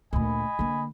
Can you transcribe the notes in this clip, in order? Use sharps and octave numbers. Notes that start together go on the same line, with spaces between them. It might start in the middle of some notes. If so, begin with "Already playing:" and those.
D2 A#2 D#5 G#5 B5
D3 A#3